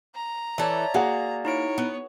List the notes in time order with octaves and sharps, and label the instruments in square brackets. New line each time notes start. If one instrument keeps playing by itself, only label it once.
[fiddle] A#5
[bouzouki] E3 A4 [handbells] C#5 D5 E5
[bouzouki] A#3 [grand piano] F#4 G#4 F#5 [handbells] D5
[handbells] D#4 E4 D7 [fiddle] C#5
[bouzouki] B3